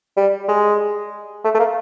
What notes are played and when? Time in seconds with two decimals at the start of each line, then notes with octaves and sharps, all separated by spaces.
0.17 G3
0.48 G#3
1.44 A3
1.55 A3
1.59 A#3